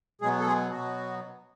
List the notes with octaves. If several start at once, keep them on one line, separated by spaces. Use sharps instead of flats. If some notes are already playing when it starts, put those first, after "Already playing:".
B2 F#3 G#3 B3 G#4
A4
G#3 G#4
B2 F#3 B3 F#4